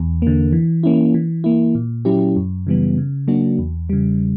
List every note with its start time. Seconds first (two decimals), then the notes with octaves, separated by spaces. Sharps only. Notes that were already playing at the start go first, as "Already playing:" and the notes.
Already playing: E2
0.22 D3 A#3
0.53 E3
0.83 A#3 C#4 E4
1.14 E3
1.44 A#3 E4
1.75 A#2
2.05 F#3 C#4 E4 G4
2.36 F#2
2.67 C#3 E3 G3 B3
2.98 C#3
3.28 F#3 A#3 D4 F#4
3.59 E2
3.89 C#3 G3